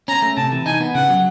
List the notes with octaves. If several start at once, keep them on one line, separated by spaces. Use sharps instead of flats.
C#4 A#5
A3
C3 A5
E3
D#4 G#5
B3
C#3 F#5
F#3